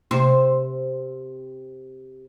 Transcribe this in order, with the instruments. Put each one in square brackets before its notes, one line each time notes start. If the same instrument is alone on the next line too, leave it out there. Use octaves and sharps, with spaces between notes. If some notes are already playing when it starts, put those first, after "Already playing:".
[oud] C3 C5